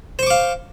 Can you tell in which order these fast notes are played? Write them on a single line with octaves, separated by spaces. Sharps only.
C5 C#6 D6 F5